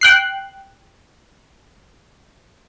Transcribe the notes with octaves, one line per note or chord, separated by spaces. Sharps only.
G5 F#6 C7